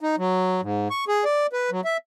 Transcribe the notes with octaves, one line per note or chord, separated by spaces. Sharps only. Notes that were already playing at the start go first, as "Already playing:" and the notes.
D#4
F#3
G#2
C#6
G#4
D5
B4
F#3
E5